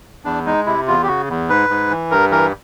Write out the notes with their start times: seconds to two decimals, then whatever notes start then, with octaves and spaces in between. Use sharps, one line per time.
0.24 E2 D4
0.46 G#3 D#4
0.66 C3 E4
0.87 E2 F4
1.03 G4
1.07 C#3 F#4
1.28 E2
1.49 G#2 B4
1.69 G#2
1.90 E3
2.11 G2 A#4
2.31 E3 A#4